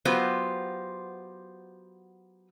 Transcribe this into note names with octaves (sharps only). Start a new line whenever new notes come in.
F#3 B3 F4 G4 C5